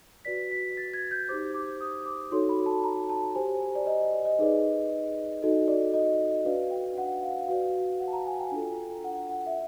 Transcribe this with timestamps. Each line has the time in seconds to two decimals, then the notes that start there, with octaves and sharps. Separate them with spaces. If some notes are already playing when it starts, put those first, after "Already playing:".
0.25 F#4 B4 D5 B6
0.51 B6
0.77 A6
0.94 G#6
1.11 G6
1.29 D#4 G4 C5 D6
1.54 D6
1.81 D#6
2.06 D6
2.31 D#4 F#4 A4 C#5 C6
2.49 B5
2.66 A5
2.84 A#5
3.10 A5
3.35 G4 C5 G#5
3.75 D5
3.87 D#5
4.00 D5
4.13 D5
4.25 D#5
4.39 D#4 G#4 B4 D5
5.42 D#4 F#4 A4 D#5
5.68 D5
5.94 D#5
6.45 D4 F#4 B4 D5 F5
6.71 G5
6.98 F#5
7.23 F5
7.48 F#4 B4 D5 F5
8.00 F#5
8.08 A5
8.13 A#5
8.27 G#5
8.39 G5
8.52 D4 F4 A4
9.04 F#5
9.29 F#5
9.46 E5